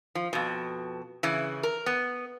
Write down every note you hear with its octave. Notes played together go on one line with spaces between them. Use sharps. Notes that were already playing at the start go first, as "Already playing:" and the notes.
F3
F2 B2
C#3 E3
A#4
B3